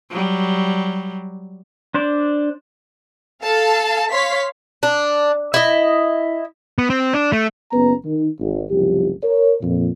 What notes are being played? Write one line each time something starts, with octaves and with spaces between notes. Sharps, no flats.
F#3 G3
D4 C5 D5
A4 F5 A5
C#5 F5 C6 B6
D4
E4 D#5
B3
C4
D4
A3
F#1 B3 C#4 B4 A#5
D#3
G#1
F#1 C2 F3 G4
A#4 C#5
F2 A#2